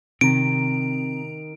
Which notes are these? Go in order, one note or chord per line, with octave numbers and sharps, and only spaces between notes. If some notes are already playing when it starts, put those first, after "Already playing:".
C3 D#3 C4 A#5 D7